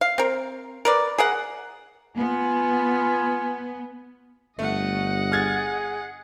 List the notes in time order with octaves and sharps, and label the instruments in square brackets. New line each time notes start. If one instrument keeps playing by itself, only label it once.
[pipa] F5
C4 A#4
A#4 B4 D5
G#4 A#4 F#5
[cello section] B3 [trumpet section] F4 G#5
[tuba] G1 [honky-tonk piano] A3 [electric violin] D#5 F#5
[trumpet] G#4 [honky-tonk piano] F6 G#6 A6